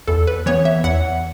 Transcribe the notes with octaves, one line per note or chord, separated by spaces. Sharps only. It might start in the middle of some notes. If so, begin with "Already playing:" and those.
E2 A4
B4
E3 B3 C#5
E5
E2 F#5